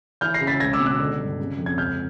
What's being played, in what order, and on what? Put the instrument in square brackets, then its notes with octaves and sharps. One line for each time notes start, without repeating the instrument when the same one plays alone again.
[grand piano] E3 F6 G6
A#6 C7
C#3
A6 B6
C#2 G#6 A#6
D6 E6
B2
E6 F#6
D3
G2
C#3
F2
G#6
C#2 F6 G6